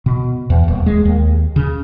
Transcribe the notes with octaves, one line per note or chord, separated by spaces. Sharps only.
B2
E2
D#1
G#3
D#2
C#3